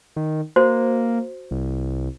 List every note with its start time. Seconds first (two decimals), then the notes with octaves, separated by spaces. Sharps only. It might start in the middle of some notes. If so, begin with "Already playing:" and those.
0.16 D#3
0.56 A#3 F#4 C5
1.51 C2